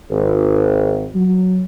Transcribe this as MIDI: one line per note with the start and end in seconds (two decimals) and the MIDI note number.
0.10 1.09 32
1.14 1.60 54